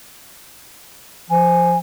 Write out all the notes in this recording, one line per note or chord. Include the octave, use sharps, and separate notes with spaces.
F3 G#5